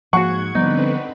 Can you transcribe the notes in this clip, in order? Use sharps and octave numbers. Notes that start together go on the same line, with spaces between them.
G#2 F3 A#3 F#4 G#4 F#5 C#6 G#6
D3 F3 G3 B3 C4 D#4 B4 D5